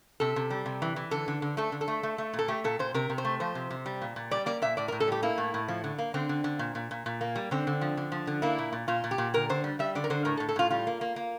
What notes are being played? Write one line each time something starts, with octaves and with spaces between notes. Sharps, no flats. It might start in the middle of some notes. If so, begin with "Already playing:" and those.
C3 A4
C3
G3
C3
E3
E3
D3 A4
D3
D3
A3 A4
D3
A4
A3
A3
A3
A#2
A4
A3 G4
A#2 A4
A#2 C5
C3 A#4
C3
C5
A3
F3 C5
C3
C3
G3
A#2
A#2
G3 D5
A#3 D5
A#2 E5
A2 D5
A#4
A2
A4
G3 G4
A#3 E4
A2
A2
F3
D3
A#3
D3 C4
D3
D3
A#2
A#2
A#2
A#2
A#3
G3
D3 C4
D3
F3
D3
F3
D3
A#3 E4
A#2
A#2
A#2 F4
A#2
G4
A#2
D3 A#4
D3 C5
G3
G3 E5
D3 D5
A#4
D3 C5
A2 A#4
A4
A2
A4
A2 F4
G3 F4
A#3
A#3
A#3